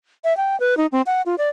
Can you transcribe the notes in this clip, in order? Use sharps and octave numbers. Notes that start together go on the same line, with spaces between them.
E5
G5
B4
D#4
C4
F#5
F4
D5